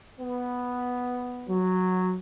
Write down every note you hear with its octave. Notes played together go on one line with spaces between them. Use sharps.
B3
F#3